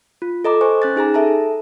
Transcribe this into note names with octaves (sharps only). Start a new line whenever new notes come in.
F4
A4 D#5 A#5 D6
C5 G#5 C#6
C#4 F#6 A6
D#4 G#4 G#5 A#5
A4 E5 A5 A#5